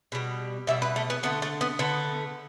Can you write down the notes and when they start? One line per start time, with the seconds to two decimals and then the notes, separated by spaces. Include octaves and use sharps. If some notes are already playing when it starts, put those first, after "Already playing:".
0.12 B2 G3
0.67 B2 G3 E5
0.82 B4
0.96 A3
1.10 B3
1.23 D3 A3 B3
1.42 A3
1.61 B3
1.79 D3 A3 B3